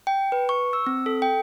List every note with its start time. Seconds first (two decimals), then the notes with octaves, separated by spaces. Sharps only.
0.07 G5
0.32 B4
0.49 C#6
0.73 E6
0.87 C4
1.06 A4
1.22 G5